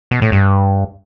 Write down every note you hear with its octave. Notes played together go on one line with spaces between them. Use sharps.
B2
A2
G2